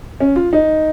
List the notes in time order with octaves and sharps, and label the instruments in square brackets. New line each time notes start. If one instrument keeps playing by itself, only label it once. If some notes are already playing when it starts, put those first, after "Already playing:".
[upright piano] C#4
F4
D#4